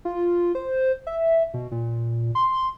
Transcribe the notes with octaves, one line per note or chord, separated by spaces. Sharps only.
F4
C5
E5
B2
A#2
C6